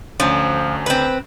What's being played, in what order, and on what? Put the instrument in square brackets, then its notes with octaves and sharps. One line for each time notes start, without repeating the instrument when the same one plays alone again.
[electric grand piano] D2 C#4 D4 [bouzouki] F3
[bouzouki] C4 B4